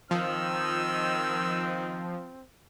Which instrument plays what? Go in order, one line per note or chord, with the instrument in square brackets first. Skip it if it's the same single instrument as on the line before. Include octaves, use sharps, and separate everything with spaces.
[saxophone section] D#3 [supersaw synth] F3 [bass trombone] C4 [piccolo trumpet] E6